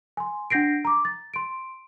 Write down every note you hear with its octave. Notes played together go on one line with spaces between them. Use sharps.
G#5 C6
D4 F#5 G6 A#6 C7 D7
A#5 D6
A6
C6 D7